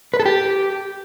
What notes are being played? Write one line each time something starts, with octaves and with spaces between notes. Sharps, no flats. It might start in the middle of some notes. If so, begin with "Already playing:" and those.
B4
A4
G4